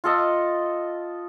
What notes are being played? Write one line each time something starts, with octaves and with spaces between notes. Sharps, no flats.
F4 A4 D#5